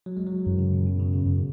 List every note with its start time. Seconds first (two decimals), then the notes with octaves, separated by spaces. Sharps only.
0.06 F#3
0.17 G#3
0.27 F#3
0.46 F#2 E3
0.59 C#3
0.73 A#2
0.87 B2
0.99 C#3
1.13 C#3
1.26 F#2 C#3